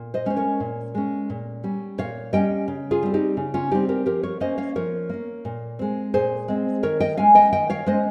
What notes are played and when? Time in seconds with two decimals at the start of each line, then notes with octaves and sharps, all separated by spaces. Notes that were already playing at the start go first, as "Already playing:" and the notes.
Already playing: A#2
0.14 C5 D#5
0.26 G#3 C#4 C5
0.36 A#4 C#5
0.60 A#2
0.95 G#3 C#4
1.30 A#2
1.64 G3 C#4
1.98 A#2 C#5 F5
2.33 G3 C#4 D#5 G5
2.68 C#3
2.91 F4 G#4
3.03 G3 C4
3.14 D#4 G4
3.37 C#3
3.54 C#4 F4
3.71 G3 C4 D#4 G4
3.89 G4 A#4
4.06 F3 G4 A#4
4.23 A#4 C#5
4.40 A#3 C#4 C5 D#5
4.58 C#5 F5
4.75 F3 A#4 C#5
5.09 A#3 C#4
5.45 A#2
5.79 G#3 C4
6.14 A#2 G#4 C5
6.48 G#3 C4
6.83 D#3 A#4 C#5
7.00 D#5 G5
7.17 G#3 C#4 F5 G#5
7.35 D#5 G5
7.52 D#3 D#5 G5
7.70 C#5 F5
7.86 G#3 C#4 C5 D#5